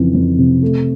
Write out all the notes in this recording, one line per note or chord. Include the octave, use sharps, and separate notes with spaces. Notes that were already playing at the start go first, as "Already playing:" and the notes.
Already playing: F2 C#3 E3
F2
C3
A3